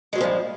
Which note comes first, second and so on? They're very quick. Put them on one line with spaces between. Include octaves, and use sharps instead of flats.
G#3 F#3 A#2 F3 G2